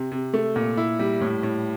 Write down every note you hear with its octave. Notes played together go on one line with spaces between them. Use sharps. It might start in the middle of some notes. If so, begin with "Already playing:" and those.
Already playing: C3
C3
A3
A#2
E4
G3
A2
A2